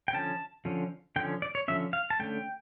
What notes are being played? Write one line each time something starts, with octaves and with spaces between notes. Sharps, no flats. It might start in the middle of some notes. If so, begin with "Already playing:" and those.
G5
D3 F3 C#4 A5
D3 F3 C#4
D3 F3 C#4 G5
D5
C#5
D3 F3 C#4 E5
F5
A5
D3 A3 C#4 G5